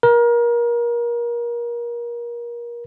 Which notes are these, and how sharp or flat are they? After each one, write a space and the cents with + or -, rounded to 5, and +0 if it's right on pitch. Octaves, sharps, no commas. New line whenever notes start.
A#4 +30